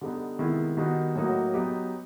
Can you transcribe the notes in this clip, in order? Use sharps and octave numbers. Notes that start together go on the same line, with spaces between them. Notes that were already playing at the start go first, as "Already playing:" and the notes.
D3 G3 B3 D#4
C3 D#3 G#3 B3 E4
D#3 G3 B3 D#4 F#4
A2 F#3 A#3 D#4 F#4
F#3 B3 D#4 G4